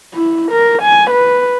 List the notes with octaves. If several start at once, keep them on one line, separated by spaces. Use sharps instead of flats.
E4
A#4
G#5
B4